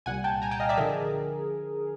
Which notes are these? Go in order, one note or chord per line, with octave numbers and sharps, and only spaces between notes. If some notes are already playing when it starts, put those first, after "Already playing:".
C2 A#2 G3 F#5 G#5
G5 A5
G#5 A#5
G5 A5
D#5 F5
D5 E5
D3 F3 G#4 A#4